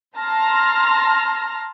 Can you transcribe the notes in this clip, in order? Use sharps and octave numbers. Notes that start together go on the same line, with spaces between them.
A5 A#5 C6 F6 A#6